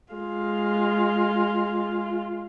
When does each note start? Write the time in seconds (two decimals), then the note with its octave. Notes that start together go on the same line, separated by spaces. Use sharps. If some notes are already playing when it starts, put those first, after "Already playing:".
0.13 G#3 F4